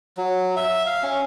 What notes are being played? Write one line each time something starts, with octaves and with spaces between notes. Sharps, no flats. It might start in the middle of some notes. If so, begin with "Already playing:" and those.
F#3
E5
F5
C#4